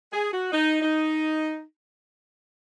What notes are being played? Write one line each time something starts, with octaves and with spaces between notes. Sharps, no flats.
G#4
F#4
D#4
D#4